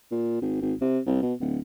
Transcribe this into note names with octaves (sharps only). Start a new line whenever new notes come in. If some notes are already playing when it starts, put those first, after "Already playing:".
A#2
G#1
G#1
C3
C2
B2
D1